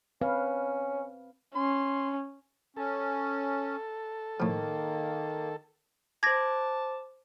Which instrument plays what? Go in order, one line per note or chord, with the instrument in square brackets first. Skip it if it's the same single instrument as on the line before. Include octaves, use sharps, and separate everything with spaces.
[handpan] C4 B4 F5 [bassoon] C#4
[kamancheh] C#4 [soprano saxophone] C6
[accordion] C#4 [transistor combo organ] A4
[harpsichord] A2 F3 [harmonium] D#3 [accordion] A#3
[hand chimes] C5 D6 [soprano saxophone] A5 [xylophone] G#6 A#6